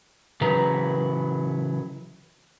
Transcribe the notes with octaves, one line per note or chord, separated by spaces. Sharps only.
C#3 E3 F#3 B4 A#5